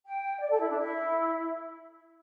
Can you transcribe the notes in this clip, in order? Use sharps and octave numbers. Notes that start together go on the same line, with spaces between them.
G5
D5
A4
E4
D4
E4